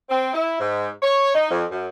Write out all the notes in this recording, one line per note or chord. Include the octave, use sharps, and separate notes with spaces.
C4
E4
G#2
C#5
D#4
F2
F#2